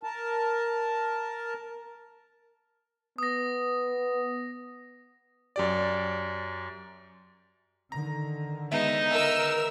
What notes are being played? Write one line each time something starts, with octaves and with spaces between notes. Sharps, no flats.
A#4 A5
B3 D#6 A#6
F#2 G4 D5
D3 D#3 A#5
G#3 B3 D#4 E5
A#4 E6